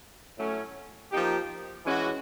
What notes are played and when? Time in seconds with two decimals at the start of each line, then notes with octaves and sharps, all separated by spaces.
0.38 A2 F#3 A3 C#4
1.11 F3 A#3 D#4 G4
1.86 E3 G#3 C#4 F#4